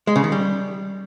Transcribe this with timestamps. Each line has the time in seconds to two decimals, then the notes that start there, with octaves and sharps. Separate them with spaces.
0.07 G#3
0.16 C#3
0.24 D#3
0.32 G3